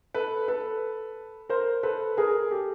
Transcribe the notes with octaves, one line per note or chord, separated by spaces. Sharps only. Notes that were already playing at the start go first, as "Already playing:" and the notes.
A4 B4
A4 B4
A#4 C5
A4 B4
G#4 A#4
G4 A4